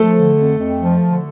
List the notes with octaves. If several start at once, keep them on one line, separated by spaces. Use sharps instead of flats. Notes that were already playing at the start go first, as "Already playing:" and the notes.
Already playing: F3 A3 A4
D3
F2
F2
F3
D3